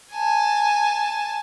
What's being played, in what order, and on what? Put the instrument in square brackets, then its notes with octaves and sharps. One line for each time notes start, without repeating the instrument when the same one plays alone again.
[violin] G#5 A5